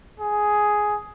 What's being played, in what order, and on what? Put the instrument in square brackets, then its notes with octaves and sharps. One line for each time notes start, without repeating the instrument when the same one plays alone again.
[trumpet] G#4